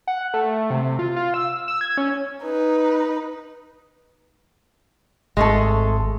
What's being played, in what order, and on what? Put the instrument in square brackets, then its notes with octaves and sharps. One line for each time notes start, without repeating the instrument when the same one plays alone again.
[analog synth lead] F#5
A3
C3
F4
F4
E6
E6
G#6
C#4
[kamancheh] D#4 B4
[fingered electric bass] G#1 [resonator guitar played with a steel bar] G#3 A3 A4